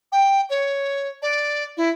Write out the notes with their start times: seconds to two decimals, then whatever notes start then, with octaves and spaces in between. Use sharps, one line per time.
0.12 G5
0.49 C#5
1.22 D5
1.77 E4